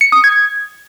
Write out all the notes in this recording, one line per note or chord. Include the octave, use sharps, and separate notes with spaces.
C#7
D#6
G#6